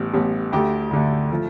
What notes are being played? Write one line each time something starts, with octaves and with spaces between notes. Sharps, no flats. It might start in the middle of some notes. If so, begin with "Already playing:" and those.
Already playing: A1 A2 G3 B3
A1 A2 G3 B3
D2 D3 A3 G4
D2 D3 A3
F3 A3